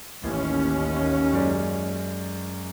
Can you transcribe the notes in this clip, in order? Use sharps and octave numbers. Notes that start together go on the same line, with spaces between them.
A1 D#2 C#4
F#2 G#3 D5